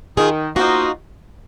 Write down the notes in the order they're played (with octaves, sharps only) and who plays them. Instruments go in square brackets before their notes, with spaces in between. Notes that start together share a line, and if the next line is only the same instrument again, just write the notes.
[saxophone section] D#3 [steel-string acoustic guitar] F4 G#4
[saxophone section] A#3 F4 C5 D#5 [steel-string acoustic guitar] D#4 F#4